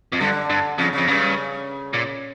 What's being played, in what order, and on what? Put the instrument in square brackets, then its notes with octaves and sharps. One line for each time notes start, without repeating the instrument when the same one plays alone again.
[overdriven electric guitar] F2
[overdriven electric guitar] G2 [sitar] D3
[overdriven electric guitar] G2
[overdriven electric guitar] F2 [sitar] C#3
[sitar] C#3
[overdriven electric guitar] F2
[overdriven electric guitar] G2 [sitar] C#3
[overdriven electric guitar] A#2